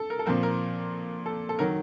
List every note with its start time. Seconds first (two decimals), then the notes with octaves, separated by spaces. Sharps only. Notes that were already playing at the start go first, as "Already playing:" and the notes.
Already playing: A4
0.10 A#4
0.19 A4
0.26 A#2 F3 C4 A#4
0.43 A#4
1.26 A4
1.49 A4
1.59 D#3 F#3 A#4